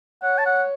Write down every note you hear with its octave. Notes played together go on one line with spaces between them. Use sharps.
C#5 F#5
A5
F#5